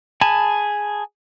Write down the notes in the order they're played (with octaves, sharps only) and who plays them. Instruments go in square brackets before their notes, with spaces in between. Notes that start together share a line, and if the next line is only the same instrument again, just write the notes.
[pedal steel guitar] G#4 G#5 A5 B5